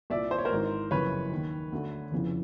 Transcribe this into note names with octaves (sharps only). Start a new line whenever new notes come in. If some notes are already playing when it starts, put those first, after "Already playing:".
C2 A#2 D5 E5
C5
C#5
A#4 C5
G#1 G#2 E3
F#1 F2 C#3 E3 B4 C#5
D#2 D#3
D2 D3
F1 F2 C#3 E3